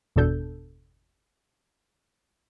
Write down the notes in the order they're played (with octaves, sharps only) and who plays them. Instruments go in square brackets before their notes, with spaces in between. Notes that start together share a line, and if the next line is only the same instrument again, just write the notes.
[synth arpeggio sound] G1 E2 B2 D4 A4 G6